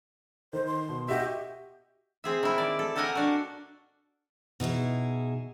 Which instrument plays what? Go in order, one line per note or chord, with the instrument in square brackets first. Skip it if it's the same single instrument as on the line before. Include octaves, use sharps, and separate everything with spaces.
[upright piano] D#3 [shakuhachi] C5
[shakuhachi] C6
[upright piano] B2
[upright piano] F#4 D#5 E5 [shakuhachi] G4
[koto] C4 G#4 E5
D#3 E4
D5
A4
G4 A4 A#4 D#5 F#5 G#5
D4 F#4
[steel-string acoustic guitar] B2 D#4 E4 G#4